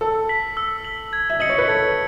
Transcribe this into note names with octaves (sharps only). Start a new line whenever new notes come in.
A4 E6
B6 F#7
E6
B6 F#7
G#6
E5
D#5 C#7 F#7
C#5
B4
A4 G#6